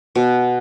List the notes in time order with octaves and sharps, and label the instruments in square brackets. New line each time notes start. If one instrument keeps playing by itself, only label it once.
[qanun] B2